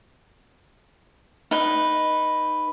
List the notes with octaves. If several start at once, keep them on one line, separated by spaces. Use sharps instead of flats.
D#4 B4